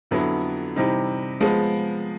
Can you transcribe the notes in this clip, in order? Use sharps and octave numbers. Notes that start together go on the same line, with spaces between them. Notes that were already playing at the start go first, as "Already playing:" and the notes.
F2 D3 F#3 B3 E4
C3 E3 G3 C4 D#4
F3 G#3 B3